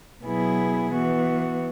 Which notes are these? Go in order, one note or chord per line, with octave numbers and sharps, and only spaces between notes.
B2 F#3 B3 E4 G#4
E3 B3 F#4